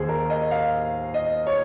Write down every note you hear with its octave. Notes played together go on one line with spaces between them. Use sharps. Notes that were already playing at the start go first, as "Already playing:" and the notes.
Already playing: D#2 D#3 G#4 C5
A#4
D#5
F5
D#5
C#5